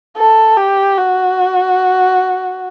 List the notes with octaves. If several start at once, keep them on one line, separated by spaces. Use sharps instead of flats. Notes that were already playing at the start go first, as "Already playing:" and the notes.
A4
G4
F#4